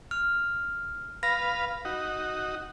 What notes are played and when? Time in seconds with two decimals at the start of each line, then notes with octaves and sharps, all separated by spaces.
0.11 F6
1.23 B4 F5 A#6
1.85 D#4 F#4